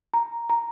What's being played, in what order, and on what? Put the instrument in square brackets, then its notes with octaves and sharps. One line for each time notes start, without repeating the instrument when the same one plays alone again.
[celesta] A#5
A#5